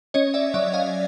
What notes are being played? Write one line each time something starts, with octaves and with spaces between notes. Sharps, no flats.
C#4 C#5 D#5
D5 E5
F#3 D5 E5
D#5 F5